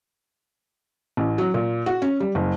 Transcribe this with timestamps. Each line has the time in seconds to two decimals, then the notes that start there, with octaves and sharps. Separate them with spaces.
1.17 A1
1.38 F#3
1.54 A#2
1.86 F#4
2.02 C#4
2.20 G3
2.35 F#1